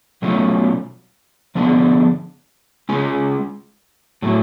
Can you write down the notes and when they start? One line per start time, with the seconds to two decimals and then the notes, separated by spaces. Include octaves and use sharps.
0.22 B2 F#3 A3 C#4 F4
1.55 D3 F3 G#3 B3 D4
2.89 G#3 C#4 F4
4.22 A2 F#3 A3